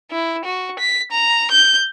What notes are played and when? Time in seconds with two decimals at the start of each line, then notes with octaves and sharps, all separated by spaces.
0.11 E4
0.45 F#4
0.79 B6
1.12 A#5
1.51 G6